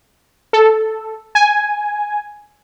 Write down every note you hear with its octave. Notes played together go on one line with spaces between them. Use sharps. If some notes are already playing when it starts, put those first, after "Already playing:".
A4
G#5